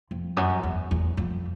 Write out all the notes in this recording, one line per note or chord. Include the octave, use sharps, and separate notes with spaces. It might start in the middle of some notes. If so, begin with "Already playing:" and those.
F2
F#2
E2
E2
F2